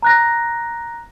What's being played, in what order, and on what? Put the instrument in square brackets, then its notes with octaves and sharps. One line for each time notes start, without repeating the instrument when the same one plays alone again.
[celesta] A#5 F#6 A#6